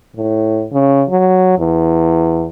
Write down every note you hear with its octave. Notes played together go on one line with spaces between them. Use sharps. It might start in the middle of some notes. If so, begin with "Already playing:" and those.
A2
C#3
F#3
E2